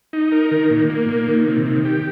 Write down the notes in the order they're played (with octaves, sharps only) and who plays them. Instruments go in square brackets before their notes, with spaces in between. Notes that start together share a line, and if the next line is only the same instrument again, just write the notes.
[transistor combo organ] D#4
A#4
D#3
A#2
A#3
A#2
D#3
C3
D#3
G4